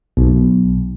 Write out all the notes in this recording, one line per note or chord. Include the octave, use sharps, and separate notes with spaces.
B1